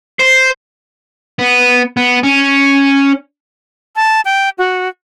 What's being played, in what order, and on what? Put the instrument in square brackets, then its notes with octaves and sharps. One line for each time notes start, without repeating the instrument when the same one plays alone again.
[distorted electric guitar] C5
B3
B3
C#4
[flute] A5
G5
F#4